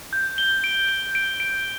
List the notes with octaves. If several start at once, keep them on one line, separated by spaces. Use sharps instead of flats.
G6
G7
D7
G7
D7
D7